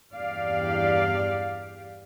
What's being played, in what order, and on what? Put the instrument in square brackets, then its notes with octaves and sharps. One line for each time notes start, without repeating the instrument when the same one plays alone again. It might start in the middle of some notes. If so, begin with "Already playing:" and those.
[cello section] E2 G2 G4 D5 F5